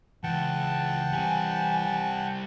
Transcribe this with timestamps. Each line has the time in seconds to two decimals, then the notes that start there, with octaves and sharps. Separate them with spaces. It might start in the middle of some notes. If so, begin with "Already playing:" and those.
0.24 C#2 E3 F#5 G5 A5
1.13 G3 C4 G#5